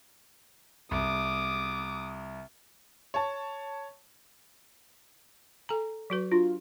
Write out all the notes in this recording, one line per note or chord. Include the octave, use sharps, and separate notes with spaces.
C2 D6 D#6
C#5 A5
A4 G#5 A#5
F#3 F#4 B4
D4 F4 F#4